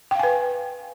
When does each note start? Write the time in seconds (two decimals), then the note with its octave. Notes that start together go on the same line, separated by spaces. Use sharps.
0.11 G5
0.15 F5
0.19 G#5
0.23 B4